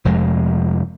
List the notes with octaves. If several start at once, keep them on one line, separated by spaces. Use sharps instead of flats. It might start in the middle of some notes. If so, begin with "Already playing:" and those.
F1 F2 G#3